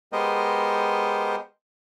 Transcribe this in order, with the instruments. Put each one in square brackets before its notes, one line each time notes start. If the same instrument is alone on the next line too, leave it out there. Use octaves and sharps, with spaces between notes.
[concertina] G#3 B3 G4 A#4 C5 D#5